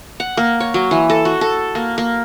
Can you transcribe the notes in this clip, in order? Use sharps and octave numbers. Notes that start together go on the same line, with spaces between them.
F#5
A#3
C#5
F#3
E3
A4
F#4
A4
A#3
A#3